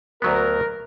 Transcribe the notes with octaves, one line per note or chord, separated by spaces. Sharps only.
D2 F#3 B3 A#4